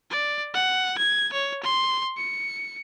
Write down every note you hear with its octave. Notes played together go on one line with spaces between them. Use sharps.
D5
F#5
G#6
C#5
C6
C#7